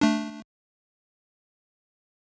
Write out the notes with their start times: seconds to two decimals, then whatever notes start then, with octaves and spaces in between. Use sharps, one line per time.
0.01 A3 D4